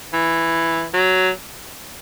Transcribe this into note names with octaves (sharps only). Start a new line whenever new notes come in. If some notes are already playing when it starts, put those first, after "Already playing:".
E3
F#3